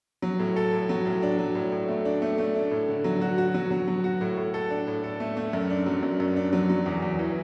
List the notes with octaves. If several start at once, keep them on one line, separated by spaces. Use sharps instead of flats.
F#3
A2
A4
A2
F#3
A2
D4
F#3
A2
A2
A3
D4
A3
A3
D4
A2
D3
F#3
F#4
F#4
F#3
F#3
F#3
F#4
A2
A2
A4
D4
A2
A4
A3
A3
F#2
D4
F#3
F#2
F#2
D4
F#3
F#3
E2
E2
E3